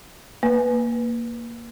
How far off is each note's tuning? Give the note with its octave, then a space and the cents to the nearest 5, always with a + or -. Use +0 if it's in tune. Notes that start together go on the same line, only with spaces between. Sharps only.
A#3 +0 B4 +0